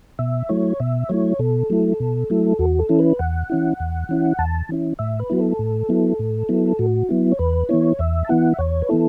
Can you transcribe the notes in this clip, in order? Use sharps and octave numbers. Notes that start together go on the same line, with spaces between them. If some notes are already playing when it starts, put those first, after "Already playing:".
B2 E5
F#3 A3 E4 C#5
B2 E5
F#3 A3 E4 C#5
B2 A4
F#3 A3 E4
B2
F#3 A3 E4
E2 F#4
A4
E3 C#4 E4
B4
E2 F#5
E3 C#4 E4
E2
E3 C#4 E4
E2 A5
E3 C#4 E4
A2 E5
B4
F#3 B3 E4 F#4
A4
A2
F#3 B3 E4
A2
F#3 B3 E4
A2 F#4
F#3 B3 E4
C#5
E2 B4
E3 B3 E4 C#5
E2 E5
A5
E3 B3 E4 F#5
E5
E2 C#5
B4
E3 B3 E4 A4